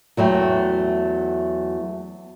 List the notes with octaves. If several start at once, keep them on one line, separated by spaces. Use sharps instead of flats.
E2 F#3 A3 G5